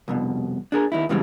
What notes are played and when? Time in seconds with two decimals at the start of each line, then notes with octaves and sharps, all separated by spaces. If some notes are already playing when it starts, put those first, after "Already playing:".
0.08 C2 F2 B2
0.72 D4 G#4 A#4
0.92 D#2 D#4 E4
1.09 F#2 C#3 E3 G3 G#3 C4